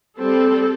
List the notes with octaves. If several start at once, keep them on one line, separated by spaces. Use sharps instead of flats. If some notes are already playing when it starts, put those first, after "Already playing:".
G3 C4 A4